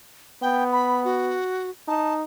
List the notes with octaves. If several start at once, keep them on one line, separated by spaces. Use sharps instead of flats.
B3 G5
B5
F#4
D#4 A5